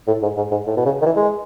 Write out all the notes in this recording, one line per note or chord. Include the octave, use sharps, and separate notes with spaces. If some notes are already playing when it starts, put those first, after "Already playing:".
A2
G#2
G#2
G#2
A2
B2
C#3
D#3
E3
G#3